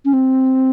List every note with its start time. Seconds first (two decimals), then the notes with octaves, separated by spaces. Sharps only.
0.05 C#4
0.13 C4